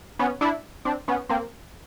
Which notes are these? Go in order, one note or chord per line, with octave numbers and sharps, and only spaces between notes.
B3 C#4
D4 E4
C4 D4
B3 C#4
A#3 C4